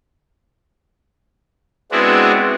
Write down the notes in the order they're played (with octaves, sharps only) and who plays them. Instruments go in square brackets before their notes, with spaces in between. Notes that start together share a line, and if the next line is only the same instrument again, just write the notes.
[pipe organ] G#3 B3 C4 D4 E4 F#4